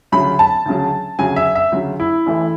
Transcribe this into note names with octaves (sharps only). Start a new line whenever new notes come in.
D2 C#3 F#3 B5
A5
D2 C#3 F#3
D2 C#3 F#3 G#5
E5
E5
D2 C#3 F#3
E4
A1 A2 E3 A3